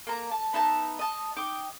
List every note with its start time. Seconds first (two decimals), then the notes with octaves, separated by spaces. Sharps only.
0.07 A#3 A#5
0.32 A5
0.53 B3 D#4 E5 A5
0.99 D#5 A5
1.36 D#4 G5 D6